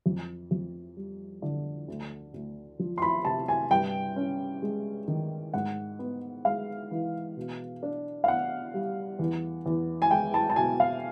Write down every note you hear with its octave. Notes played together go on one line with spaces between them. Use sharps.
F2
F2
G3
D3
D2
D2
F3
C6
B5
C3 A5
G#5
G2 G5
C#4
G#3
D#3
G#2 F#5
B3
G#3 F5
E3
B2
D4
F5
B3 F#5
G3
E2
E2
G#5
G#3 G5
A5
A5
B2 G#5
F5